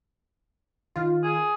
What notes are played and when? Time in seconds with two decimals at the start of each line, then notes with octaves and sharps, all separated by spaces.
0.96 D#3 F4
1.23 G#4